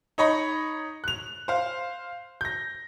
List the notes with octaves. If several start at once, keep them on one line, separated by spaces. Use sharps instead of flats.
D#4 C#5 D#5 B5
F#6 F7
C5 F5
G6 A#6